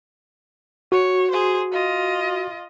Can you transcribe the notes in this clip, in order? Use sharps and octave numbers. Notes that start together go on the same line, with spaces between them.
F#4 C#5
G#4 C5
F4 D#5